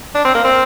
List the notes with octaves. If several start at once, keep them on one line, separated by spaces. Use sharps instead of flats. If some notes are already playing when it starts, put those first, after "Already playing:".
D4
C4
A#3
C4